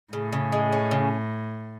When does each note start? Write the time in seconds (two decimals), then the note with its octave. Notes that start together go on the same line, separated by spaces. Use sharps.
0.13 A2 C#3
0.32 C#3
0.52 G#3
0.72 C#4
0.91 C#3